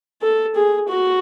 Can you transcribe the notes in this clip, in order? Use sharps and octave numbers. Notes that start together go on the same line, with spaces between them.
A4
G#4
F#4